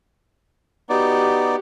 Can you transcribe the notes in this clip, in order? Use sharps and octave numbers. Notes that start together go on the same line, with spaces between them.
B3 D#4 F#4 G4 D5